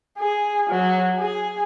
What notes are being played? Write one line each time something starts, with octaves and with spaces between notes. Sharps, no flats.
G#4
F#3
G#4